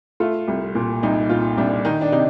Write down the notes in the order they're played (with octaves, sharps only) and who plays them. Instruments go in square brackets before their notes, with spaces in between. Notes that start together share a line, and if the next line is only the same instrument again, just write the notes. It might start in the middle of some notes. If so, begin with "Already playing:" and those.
[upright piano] A3 F4
C2
A#2
C2 D#4
A#2 F4
C2 D4
D#3 D#4
D4
C3 D#4